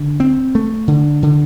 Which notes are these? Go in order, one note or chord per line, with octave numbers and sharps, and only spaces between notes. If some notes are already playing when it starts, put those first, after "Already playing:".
Already playing: D3
C4
A3
D3
D3